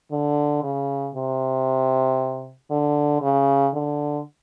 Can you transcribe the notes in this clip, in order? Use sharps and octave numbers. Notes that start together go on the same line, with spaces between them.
D3
C#3
C3
D3
C#3
D3